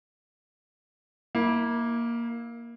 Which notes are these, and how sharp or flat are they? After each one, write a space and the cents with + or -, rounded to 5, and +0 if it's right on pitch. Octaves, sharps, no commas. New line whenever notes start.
A#3 +5 E4 -25